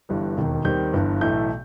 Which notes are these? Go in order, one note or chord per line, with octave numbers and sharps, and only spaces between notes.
G1 G2 E3 G3
E1 D#2 D#3
D#2 D#3 G3 C4 G6
G1 G2 E3
B1 A2 E3 A3 G6